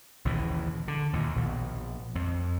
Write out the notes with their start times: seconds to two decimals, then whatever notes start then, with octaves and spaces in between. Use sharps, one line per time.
0.25 A#1 D#2 C#3 E3
0.88 D3
1.13 D#2 A#2
1.35 A#1 B2
2.15 F2